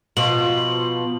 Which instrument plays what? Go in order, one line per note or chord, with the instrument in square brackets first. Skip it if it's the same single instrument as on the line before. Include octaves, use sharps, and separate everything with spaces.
[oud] B2 [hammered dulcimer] F3 F4 C5 [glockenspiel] F#7